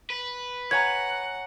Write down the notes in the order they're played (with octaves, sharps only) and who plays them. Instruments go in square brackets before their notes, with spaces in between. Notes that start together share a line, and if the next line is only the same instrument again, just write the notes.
[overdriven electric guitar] B4
[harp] C#5 G#5 A#5 [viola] F#5 [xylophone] G#6